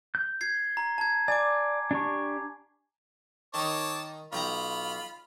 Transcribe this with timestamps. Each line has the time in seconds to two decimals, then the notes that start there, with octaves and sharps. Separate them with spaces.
0.15 G6
0.41 G#6 C7
0.77 A#5
0.98 A5 G#6
1.28 D5 G#5 D6
1.91 D4 G4 C#6
3.54 D#3 D#4 C#5 A5 D6
4.33 B1 F4 G5 A#5 B5